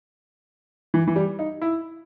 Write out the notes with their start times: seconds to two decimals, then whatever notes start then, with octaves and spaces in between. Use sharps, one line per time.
0.94 E3
1.07 E3
1.16 G3
1.39 D#4
1.62 E4